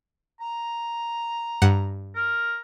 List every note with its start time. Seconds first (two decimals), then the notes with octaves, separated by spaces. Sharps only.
0.41 A#5
1.62 G2 F#5
2.15 A#4